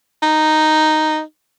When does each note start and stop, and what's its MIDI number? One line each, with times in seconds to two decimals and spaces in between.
0.23 1.21 63